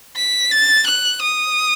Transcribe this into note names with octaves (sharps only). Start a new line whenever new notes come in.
B6
A6
F#6
D#6